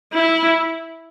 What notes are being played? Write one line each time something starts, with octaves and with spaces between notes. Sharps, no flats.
E4